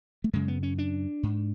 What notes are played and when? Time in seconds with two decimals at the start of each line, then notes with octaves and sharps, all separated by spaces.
0.24 A3
0.33 F#2 C#3 G#3
0.48 B3
0.63 C#4
0.78 D4
1.23 G#2